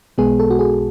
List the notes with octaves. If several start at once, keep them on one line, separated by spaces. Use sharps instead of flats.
B1 B2 G#3 B3 G#4
A4
F#4
G#4